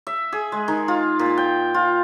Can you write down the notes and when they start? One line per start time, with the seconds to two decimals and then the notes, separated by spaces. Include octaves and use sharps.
0.07 E5
0.32 G#4
0.52 G#3
0.68 D#3
0.88 F4
1.19 A#2
1.37 G5
1.74 F4